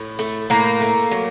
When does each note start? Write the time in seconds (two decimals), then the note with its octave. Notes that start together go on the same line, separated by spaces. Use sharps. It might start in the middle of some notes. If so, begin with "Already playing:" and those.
Already playing: A2
0.19 A3
0.50 A2 A#3
0.81 A3
1.11 F#3